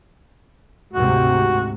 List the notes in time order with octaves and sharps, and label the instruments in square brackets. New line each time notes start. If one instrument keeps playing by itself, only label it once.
[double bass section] D2 G#2 C3 [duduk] F#4